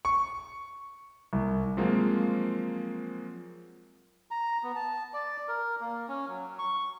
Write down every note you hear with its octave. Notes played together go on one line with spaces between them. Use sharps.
C#6
C2
F3 F#3 G#3 A#3 C4 F4
A#5
B3
A5
D5
A#4
A#3
C#4
F#3
C#6